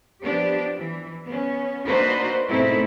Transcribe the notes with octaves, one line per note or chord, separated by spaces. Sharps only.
F3 B3 D4 G4
E3
B3 C#4
A#3 D4 D#4 F#4 B4 C5
G#2 B2 A3 C4 D#4 E4